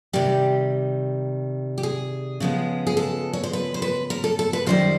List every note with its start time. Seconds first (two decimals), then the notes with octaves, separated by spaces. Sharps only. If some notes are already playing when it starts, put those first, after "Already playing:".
0.13 C3 D#3 G3 G4
1.78 G4
1.83 G#4
2.40 C#3 F3 G#3 B3
2.87 G#4
2.97 A4
3.33 C#5
3.43 C5
3.53 B4
3.74 C5
3.82 B4
4.10 A#4
4.24 A4
4.39 A4
4.53 B4
4.67 F#2 D#3 G3 C5